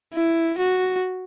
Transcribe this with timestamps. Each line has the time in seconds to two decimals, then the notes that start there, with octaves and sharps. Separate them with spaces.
0.14 E4
0.58 F#4